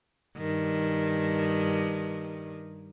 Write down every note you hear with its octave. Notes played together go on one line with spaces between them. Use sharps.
G2 D#3